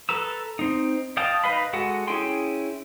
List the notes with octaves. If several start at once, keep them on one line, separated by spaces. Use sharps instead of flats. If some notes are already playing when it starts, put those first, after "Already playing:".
A4 B4 A#5 E6
C4 D#4
D#5 F5 G5 A5 D#6
D#4 B4 D#5 F5 B5
G#3 F#4 A4 F#5
C#4 E4 G#4 G5 C6